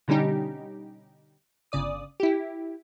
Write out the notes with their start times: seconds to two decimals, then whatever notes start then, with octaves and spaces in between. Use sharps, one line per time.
0.08 B2 D3 G3 C#4 D#4 G4
1.72 G1 C#3 D5 D#6
2.20 E4 G4